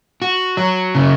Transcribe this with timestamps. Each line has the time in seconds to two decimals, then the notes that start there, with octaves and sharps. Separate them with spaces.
0.22 F#4
0.57 F#3
0.95 C#3